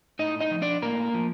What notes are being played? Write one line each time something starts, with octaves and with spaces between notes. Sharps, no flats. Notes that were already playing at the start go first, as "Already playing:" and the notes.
A2 D#4 D#5
D#4 D#5
F3
D4 D5
A2 A#3 A#4
F3